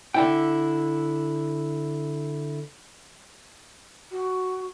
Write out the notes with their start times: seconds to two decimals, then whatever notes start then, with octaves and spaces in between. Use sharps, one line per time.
0.14 D3 E4 G5
4.11 F#4